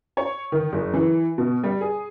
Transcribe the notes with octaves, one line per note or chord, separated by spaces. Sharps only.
C#5
D#3
F#1
E3
B2
G3
G#4